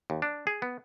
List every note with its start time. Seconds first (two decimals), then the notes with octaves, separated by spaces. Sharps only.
0.10 D#2
0.22 D4
0.47 G#4
0.62 B3